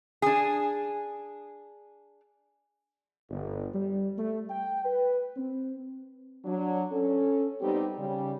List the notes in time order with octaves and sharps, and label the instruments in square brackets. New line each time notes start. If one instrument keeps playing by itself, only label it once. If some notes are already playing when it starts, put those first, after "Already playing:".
[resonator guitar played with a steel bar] D4 G#4
[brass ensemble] G1
G3
A3
G5
B4
C4
[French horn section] F#3 D4
C#4 A4
G3 B3 C4 D#4 G4
C#3 G3